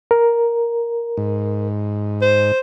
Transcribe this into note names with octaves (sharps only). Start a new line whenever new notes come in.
A#4
G#2
C5